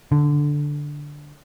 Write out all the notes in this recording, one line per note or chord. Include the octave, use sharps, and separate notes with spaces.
D3